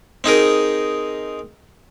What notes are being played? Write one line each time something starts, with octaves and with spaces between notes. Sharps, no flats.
C4 D#4 G#4 A#4